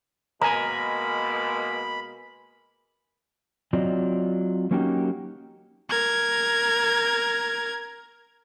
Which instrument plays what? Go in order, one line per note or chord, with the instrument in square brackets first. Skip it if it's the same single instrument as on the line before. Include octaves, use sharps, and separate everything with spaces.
[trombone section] B2 G#3 A#3 [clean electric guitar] A#4 G#5 [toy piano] A#5 [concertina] B5
[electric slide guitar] F#3 C4 F4 D5 D#5
F#3 A#3 C#4 D#4 F#4 G4
[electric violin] A#4 G#6